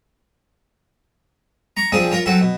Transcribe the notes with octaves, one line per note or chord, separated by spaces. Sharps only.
A#5 C#6
F3 C4 D4 G#4 D#6
F4 A#4 C#5
F#3 C4 F#4 A4
B2